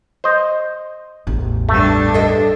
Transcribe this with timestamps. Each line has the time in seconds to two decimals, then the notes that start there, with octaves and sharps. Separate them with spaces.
0.24 C5 D#5
1.27 A1 E2
1.69 G2 A3 D4
2.14 A4 D#5